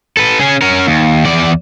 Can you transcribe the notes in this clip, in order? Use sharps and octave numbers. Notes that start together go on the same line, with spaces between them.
A4 B4
C#4 G#4
C#4 A#4
D#2
E2 D5